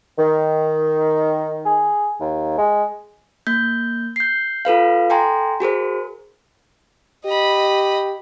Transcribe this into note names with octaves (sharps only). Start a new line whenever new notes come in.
D#3
G#4
D#2
G#3
A#3 G6
G6 C7
F4 A4 B4 F5
A4 G5 G#5 A#5 C6
F#4 G#4 A#4 C5
G4 D#5 B5